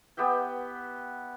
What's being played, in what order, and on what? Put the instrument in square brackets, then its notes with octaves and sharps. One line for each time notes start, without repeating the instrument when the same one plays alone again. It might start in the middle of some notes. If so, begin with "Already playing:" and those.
[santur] B3 G4 E5 G5